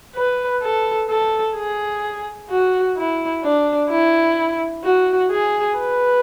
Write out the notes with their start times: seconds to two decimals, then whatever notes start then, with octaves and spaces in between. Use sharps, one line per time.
0.15 B4
0.62 A4
1.10 A4
1.56 G#4
2.50 F#4
2.97 E4
3.43 D4
3.90 E4
4.84 F#4
5.31 G#4
5.78 B4